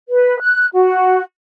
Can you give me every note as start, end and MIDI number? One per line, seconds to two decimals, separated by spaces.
0.09 0.39 71
0.40 0.67 90
0.73 1.22 66